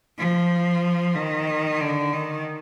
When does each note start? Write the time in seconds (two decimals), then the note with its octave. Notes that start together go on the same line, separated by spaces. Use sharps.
0.18 F3
1.16 D#3
1.81 D3
2.13 D#3